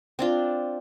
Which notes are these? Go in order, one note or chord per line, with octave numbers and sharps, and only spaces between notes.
C4 D4 F4